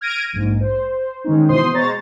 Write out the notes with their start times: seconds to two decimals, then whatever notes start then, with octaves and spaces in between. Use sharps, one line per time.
0.01 F6 G#6 A#6 D7 D#7
0.33 A#1 G#2
0.60 C5
1.24 D#3 G#3 C#4 D#4
1.49 B2 E3 C5 C6 D#6
1.73 B2 G#3 C5 C#5 A#5 A6